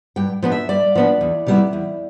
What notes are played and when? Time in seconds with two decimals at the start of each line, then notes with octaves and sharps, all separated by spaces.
0.16 G2 G5
0.43 F3 B3 D4
0.52 E5
0.69 G2 D5
0.95 F3 B3 D4
1.21 E2
1.47 C3 G3 B3 E4
1.73 E2